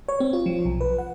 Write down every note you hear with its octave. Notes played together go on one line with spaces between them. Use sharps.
C#5
C4
F4
F3
B1
B4
F#5